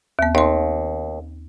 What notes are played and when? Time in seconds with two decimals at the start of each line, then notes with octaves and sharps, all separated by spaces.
0.19 D#2 B3
0.35 D#2 D#4 C6